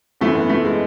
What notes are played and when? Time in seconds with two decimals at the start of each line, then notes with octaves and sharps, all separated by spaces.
0.21 G#1 F#2 E3 A3
0.35 B3
0.49 A3
0.65 G#3